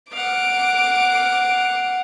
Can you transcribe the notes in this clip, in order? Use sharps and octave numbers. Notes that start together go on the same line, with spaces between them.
F5 F#5 D6 D7